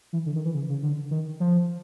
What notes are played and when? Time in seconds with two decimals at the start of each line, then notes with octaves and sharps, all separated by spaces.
0.13 E3
0.26 D3
0.35 D#3
0.45 E3
0.54 C#3
0.69 C#3
0.83 D3
1.11 D#3
1.40 F3